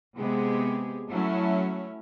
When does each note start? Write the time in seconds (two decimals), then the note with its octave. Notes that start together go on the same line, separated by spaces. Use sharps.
0.16 C3 G#3 B3 G4 G#4
1.10 F#3 A3 C#4 E4